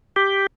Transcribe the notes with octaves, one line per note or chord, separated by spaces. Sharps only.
G4